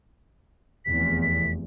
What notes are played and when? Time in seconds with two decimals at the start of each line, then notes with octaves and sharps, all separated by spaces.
0.85 F1 E2 B6
1.22 B6